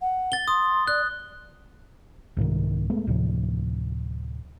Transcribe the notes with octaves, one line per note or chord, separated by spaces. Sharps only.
F#5
A6 G7
C6 D#6
D5 F#6
C2 G#2 C3 D#3
G#3 A3 B3
D2 A2 C3 F3